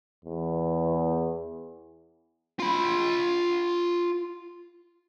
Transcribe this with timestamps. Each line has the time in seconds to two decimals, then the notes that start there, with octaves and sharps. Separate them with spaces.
0.25 E2
2.60 F4 B5